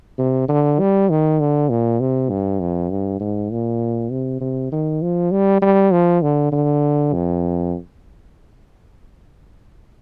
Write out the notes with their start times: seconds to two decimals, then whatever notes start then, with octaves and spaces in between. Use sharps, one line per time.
0.18 C3
0.48 D3
0.80 G3
1.10 D#3
1.40 D3
1.69 A#2
2.00 C3
2.29 G2
2.60 F2
2.90 G2
3.20 G#2
3.51 A#2
4.11 C3
4.40 C3
4.72 D#3
5.02 F3
5.31 G3
5.61 G3
5.92 F3
6.22 D3
6.52 D3
7.13 F2